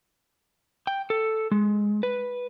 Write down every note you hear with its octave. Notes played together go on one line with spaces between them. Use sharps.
G5
A4
G#3
B4